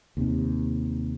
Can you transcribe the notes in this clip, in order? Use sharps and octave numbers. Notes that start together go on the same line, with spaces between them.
D#2 C3